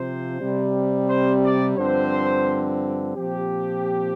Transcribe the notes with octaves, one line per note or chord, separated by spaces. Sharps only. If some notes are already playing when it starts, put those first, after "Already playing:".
Already playing: C3 F3 C4 C5
C3 G3 C4
C5
D5
G2 D3 F3 C4 C5
A#2 F3 C4 G4